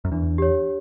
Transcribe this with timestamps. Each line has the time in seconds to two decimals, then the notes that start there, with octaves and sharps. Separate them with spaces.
0.05 F#2
0.12 E2 D4
0.38 G4 C#5